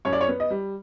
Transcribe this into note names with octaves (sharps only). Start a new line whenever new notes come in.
F#2 C#5
D5
C#5
B3
D#5
G3